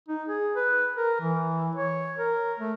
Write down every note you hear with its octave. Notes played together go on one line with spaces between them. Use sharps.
D#4
G#4
B4
A#4
E3
C#5
A#4
A3